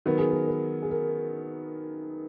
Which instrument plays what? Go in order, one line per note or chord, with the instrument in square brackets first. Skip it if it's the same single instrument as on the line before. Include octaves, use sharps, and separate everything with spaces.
[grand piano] D#3 F#3 B3 [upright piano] A#4
[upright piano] G#4
A#4
B4
G#4
A#4